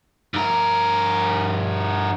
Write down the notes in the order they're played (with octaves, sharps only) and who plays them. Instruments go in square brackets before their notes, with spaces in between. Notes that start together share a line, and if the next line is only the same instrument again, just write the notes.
[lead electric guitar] G2 A#4